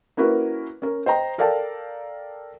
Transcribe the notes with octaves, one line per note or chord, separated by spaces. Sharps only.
A#3 C#4 E4 F#4 A#4 B4
C#4 A#4
C5 D#5 G5 A#5
A4 A#4 D5 F5 G5 A5